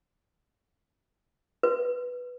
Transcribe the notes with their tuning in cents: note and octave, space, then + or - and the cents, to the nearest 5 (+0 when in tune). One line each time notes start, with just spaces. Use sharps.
B4 +0